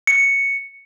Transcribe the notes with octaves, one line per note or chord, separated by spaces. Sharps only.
C#7